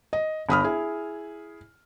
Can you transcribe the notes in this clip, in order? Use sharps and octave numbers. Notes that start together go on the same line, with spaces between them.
D#5
G1 B5 D#6 F6
E4 G#4